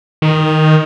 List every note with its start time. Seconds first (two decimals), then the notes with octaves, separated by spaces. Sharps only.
0.22 D#3